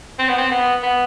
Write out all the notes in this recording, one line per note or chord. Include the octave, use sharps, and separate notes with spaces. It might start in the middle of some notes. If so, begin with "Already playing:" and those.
C4
B3
C4
B3
B3